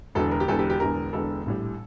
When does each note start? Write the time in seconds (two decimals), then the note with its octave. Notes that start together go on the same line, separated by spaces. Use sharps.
0.15 E1 E2 D3 A4
0.31 A#4
0.40 G4
0.48 E1 E2 D3 A4
0.59 G4
0.70 G4
0.80 E1 E2 D3 A#4
1.13 E1 E2 D3 A4
1.46 A#1 A2 G3